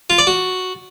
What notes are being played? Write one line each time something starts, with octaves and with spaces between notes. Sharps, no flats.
F4
D5
F#4